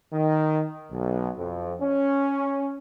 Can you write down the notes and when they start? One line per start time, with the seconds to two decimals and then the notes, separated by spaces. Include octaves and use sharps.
0.12 D#3
0.91 B1
1.38 F2
1.82 C#4